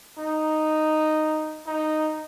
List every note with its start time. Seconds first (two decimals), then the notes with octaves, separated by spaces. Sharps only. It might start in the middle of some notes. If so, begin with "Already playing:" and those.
0.18 D#4
1.66 D#4